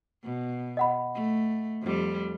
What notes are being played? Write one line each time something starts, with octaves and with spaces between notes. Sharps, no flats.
B2
D#5 F#5 B5
A3
F2 G3